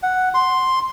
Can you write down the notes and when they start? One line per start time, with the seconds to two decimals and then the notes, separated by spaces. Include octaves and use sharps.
0.03 F#5
0.34 C6